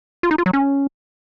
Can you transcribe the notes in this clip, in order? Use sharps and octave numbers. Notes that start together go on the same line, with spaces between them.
F4
D#4
F4
F#3
C#4